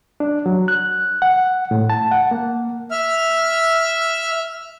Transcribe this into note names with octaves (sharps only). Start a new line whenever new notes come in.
D4
F#3
F#6
F#5
A2
A5
F#5
A#3
E5 F6